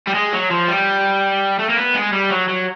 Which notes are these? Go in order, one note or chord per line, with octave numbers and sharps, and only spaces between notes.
G3
G#3
F#3
F3
G3
A3
A#3
B3
G#3
G3
F#3
F#3